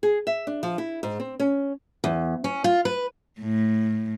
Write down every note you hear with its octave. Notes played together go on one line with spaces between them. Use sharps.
G#4
E5
D4
F3
E4
G#2
C4
C#4
E2
C#4
F4
B4
A2